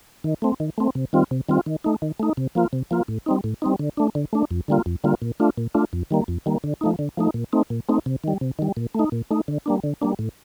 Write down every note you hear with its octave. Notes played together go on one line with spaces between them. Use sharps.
D#3
A3 C4
D#3
A3 C4
C3
D#3 G3 C4 F4
C3
D#3 G3 C4 F4
D#3
A3 D#4
D#3
A3 D#4
C3
F3 A#3 F4
C3
F3 A#3 F4
A2
G3 C4 D#4
A2
G3 C4 D#4
D3
A3 D4
D3
A3 D4
F2
D3 G3 A#3 F4
F2
D3 G3 A#3 F4
A#2
A3 D4 F4
A#2
A3 D4 F4
F2
D#3 G3 A#3
F2
D#3 G3 A#3
D3
F3 A3 D#4
D3
F3 A3 D#4
A#2
A3 C4 D#4
A#2
A3 C4 D#4
C3
D#3 G3
C3
D#3 G3
A#2
A3 D#4
A#2
A3 D#4
D3
G3 A#3 D4
D3
G3 A#3 D4
A2